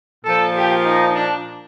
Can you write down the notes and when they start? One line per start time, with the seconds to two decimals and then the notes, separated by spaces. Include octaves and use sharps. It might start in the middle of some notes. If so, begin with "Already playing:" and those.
0.24 A#2 F3 A4
0.54 G4
0.85 D#4
1.14 D4